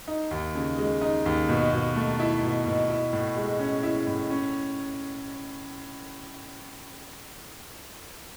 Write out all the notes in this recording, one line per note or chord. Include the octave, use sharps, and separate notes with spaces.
D#4
D#2
C#3
G#3
D#4
D#2
B2
B2
A3
E4
B2
B2
E4
A2
G#3
C#4
E4
A2
C#4